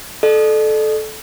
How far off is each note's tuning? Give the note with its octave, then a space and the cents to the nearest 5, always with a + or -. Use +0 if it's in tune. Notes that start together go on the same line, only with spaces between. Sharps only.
A4 -20 D5 +45